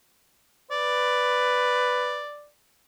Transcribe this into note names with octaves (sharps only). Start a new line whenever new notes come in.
B4 D5